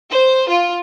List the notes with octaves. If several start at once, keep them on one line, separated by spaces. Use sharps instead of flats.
C5
F4